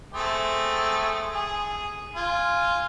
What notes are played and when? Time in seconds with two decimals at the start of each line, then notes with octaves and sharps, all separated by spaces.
0.13 A3 C4 G#4
1.34 G#4
2.16 F4 G#5